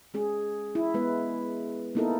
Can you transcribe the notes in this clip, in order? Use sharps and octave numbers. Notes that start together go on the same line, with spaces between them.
G#3 C#4 G#4
E4
G#3 B3 B4
A#3 B3 D#4 E4 A4 A#4